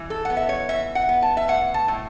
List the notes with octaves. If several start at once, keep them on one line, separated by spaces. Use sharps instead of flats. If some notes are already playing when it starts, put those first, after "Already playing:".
Already playing: E3
A4
B3 F#5
E5
C#5
E3 E5
F#5
B3
A5
E5
A2 F#5
A5
A2